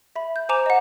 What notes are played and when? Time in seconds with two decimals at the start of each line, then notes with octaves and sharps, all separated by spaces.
0.16 E5 B5
0.36 G6
0.49 C5 G#5 A#5 D6 E7 F7
0.66 D#5 F#5